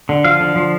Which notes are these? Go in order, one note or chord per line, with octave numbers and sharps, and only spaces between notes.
D3
F3 F5
D3
F3